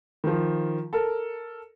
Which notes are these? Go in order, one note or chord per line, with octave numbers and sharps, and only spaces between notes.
D#3 F3
A4 A#4